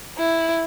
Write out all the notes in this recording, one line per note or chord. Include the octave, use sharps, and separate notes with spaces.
E4